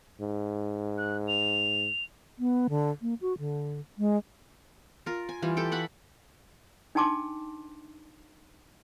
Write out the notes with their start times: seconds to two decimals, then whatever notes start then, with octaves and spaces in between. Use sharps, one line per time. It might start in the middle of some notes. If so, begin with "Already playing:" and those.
0.20 G#2
0.98 F#6
1.27 F7
2.39 B3
2.69 D3
3.02 A#3
3.21 F#4
3.39 D3
3.98 G#3
5.06 F4 A#4
5.29 G#5
5.42 E3 G3 F4
5.57 G4 A4 G5
5.72 D5 F#5 B5 C#6
6.95 D4 D#4 G5 A5 C6 D6